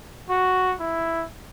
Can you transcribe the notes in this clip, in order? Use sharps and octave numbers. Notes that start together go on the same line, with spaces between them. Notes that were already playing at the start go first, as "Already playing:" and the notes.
F#4
E4